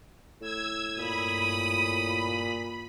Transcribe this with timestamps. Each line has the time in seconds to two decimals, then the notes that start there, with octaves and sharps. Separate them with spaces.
0.41 A2 E6 G#6
0.97 G2 A#2 B5 D#6